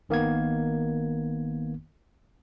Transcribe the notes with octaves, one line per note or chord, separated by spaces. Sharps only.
G#1 D#3 A#3 B3 G#6